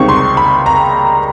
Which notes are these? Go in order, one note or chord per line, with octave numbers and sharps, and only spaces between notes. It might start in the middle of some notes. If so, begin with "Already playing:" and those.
Already playing: C#2 C3 D#3 G3 C4 C#6
C6
B5
A#5